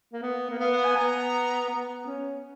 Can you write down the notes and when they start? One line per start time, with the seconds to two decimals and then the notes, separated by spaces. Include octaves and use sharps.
0.13 A#3
0.22 B3
0.50 A#3
0.59 B3 F5
0.72 F#5
0.84 G#5
0.96 B3 A#5
1.70 B3
2.06 C#4